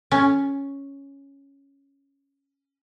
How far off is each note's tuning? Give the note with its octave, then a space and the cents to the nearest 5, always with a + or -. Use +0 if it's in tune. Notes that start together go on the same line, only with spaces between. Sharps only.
C#4 +0